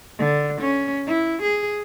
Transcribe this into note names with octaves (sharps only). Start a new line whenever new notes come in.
D3
C#4
E4
G#4